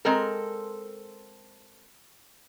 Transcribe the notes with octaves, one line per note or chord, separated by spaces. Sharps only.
G#3 C4 A4 A#4